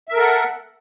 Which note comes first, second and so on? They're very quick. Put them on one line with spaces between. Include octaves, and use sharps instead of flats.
E5 A#4 A4 F#5